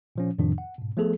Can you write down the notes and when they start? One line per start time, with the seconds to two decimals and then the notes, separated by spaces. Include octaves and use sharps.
0.16 A#2 F3 C#4
0.39 F2 A2 C3 D#3 F3 D4
0.58 F#5
0.78 G#2 B2
0.97 F3 A3 B3 G#4 A4